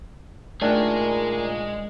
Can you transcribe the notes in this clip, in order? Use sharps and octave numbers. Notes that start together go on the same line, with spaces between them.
A#2 D#3 G#3 A3 D4 G#4